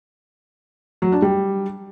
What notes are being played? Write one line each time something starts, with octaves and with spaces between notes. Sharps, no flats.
F#3
D4
G3